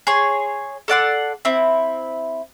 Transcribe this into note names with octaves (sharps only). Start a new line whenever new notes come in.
G#4 C#5 C6
A4 D5 F#5 C6
C4 E4